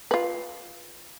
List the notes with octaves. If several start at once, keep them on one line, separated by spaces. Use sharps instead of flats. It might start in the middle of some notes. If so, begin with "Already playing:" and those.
F4 B4